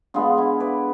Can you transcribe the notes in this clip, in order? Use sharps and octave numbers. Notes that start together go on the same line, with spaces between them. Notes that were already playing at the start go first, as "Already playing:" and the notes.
D3 G#3 B3 F4
E4
B4 D5